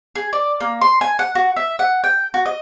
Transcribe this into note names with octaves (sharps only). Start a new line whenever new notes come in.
G#4
D5
A#3
C6
G#5
F#5
F#4
E5
F#5
G5
F#4
D#5